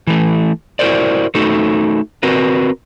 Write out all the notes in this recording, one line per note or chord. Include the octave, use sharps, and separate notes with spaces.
E3 A3
E4 F#4 A#4 C5 D5
A3 D#4 F#4 A4
C4 F#4 A#4 B4